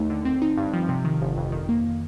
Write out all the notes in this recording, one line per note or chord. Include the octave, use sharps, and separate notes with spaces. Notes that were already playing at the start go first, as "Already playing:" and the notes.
Already playing: D#2 A3 D#4
D3
C4
D#4
G2
F3
C3
D#3
G1
F2
D#3
A#3